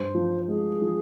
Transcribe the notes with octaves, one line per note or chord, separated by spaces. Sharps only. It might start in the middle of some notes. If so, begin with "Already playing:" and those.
Already playing: G2 C5
F3
G#3 G#4
F3